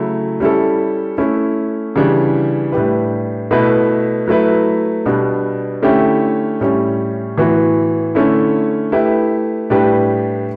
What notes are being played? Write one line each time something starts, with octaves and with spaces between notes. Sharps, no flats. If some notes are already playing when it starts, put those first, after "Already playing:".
Already playing: C#3 F#3 A3 E4
G3 C#4 E4 A4
A3 C#4 E4
C#3 E3 G3 D4
A2 G3 D4 G4 B4
B2 A3 E4 B4
F#3 A3 E4 B4
B2 G3 B3 D4
D3 A3 C#4 E4 G4
A2 G3 C#4
A2 E3 B3 F#4
D3 A3 C#4 E4
A3 E4 G4 B4
A2 G3 D4 G4 B4